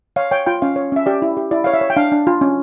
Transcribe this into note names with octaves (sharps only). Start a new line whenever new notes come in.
C#5 F5
C#5 G5
F4 G5
C#4 F5
C#5
C#4 E5
G4 D5
E4
G4
E4 D5
C#5 F5
E5
C#5
G5
D4 F5
D4
F4
C#4